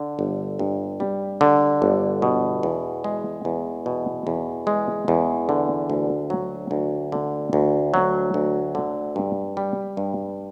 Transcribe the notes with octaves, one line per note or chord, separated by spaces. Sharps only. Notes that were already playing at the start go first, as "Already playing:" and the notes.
Already playing: D3
G1
G2
G3
D3
G1
B2
E2
G#3
E2
B2
E2
G#3
E2
D3
D2
F#3
D2
D3
D2
F#3
D2
D3
G2
G3
G2